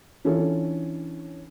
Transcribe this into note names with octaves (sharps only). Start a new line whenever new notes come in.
E3 C#4 D4 F4 A4